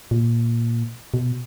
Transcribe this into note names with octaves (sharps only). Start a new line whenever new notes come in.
A#2
B2